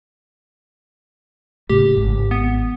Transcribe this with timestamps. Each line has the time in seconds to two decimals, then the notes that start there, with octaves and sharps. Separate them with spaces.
1.69 A2 C#3 A3 G4
1.96 G#1 G#2
2.31 B3